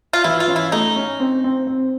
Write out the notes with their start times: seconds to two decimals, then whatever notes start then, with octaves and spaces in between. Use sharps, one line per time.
0.13 F4
0.24 E3 E4
0.40 F4
0.48 C#4
0.56 E4
0.72 A3 D#4
0.96 C#4
1.20 C4
1.44 C4
1.67 C4